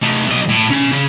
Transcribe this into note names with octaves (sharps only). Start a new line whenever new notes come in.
A3 D#4
B1 D#5
A2
C#4 B5
C#3